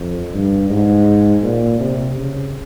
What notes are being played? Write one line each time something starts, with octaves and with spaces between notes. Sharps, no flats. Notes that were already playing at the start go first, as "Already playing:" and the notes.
Already playing: F2
G2
G#2
A#2
C3
C#3